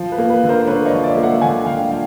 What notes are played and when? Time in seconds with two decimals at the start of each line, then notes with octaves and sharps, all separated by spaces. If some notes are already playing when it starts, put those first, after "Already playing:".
Already playing: F3
0.12 B4
0.18 A#3
0.30 B4
0.43 D3
0.49 A#4 C5
0.67 D3 B4 C#5
0.86 C#5 D#5
0.92 F3
1.04 D5 E5
1.17 A#3
1.23 E5 F#5
1.41 D3 F#5 G#5
1.66 D3 F5 G5
1.91 F3 F5 G5